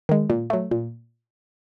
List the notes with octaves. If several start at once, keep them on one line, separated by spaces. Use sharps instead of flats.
D#3 G#3
A#2
F#3 A3
A#2